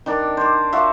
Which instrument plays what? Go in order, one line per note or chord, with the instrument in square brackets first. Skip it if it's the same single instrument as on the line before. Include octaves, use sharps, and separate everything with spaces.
[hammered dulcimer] D#3 D4 A#4
C5 D5
F4 F#4 D5 E5